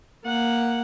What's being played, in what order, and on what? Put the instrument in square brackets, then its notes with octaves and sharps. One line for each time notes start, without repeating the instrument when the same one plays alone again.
[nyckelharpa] A#3 F#5